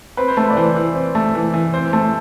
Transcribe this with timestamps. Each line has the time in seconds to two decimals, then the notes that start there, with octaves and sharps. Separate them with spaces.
0.17 C4 B4
0.28 C5
0.37 A3 B4
0.50 D5
0.57 E3 C5
0.76 E3
0.95 C4
1.15 A3
1.35 E3
1.54 E3
1.74 C4 C5
1.93 A3